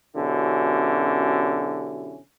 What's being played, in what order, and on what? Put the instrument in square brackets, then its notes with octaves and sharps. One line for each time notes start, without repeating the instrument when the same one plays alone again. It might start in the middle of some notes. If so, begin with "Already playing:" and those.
[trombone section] F#2 B2 D3 C#4 E4 G4